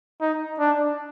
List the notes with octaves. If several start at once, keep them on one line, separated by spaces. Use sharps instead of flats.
D#4
D4